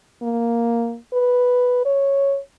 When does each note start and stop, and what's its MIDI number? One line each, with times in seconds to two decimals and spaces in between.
0.22 0.97 58
1.13 1.82 71
1.85 2.38 73